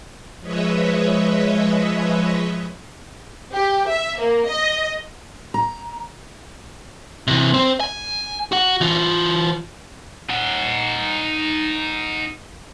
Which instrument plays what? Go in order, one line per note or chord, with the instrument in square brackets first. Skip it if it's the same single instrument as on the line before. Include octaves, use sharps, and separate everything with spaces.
[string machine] F3 G#3 B4 C#5 D#5 E5
[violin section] G4
E5
A#3
D#5
[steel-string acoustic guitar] A#5
[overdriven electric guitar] C3 E3
C4 C5
G#5
F#4 F#5
E3 F4
[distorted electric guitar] D#4 F#5